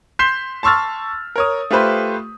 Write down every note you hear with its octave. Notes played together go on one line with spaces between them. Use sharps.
C6 G6 B6 C7 E7 G7
A5 C6 C#6 E6 F6 A6
A#4 C#5 D#6
A3 F4 G4 B4 C5